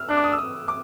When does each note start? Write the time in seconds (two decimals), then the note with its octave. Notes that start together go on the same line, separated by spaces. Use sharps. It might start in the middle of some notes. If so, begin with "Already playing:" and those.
Already playing: E6 F6
0.09 D4 F#6
0.17 D6
0.24 D#6
0.32 E6
0.38 D#6
0.68 D6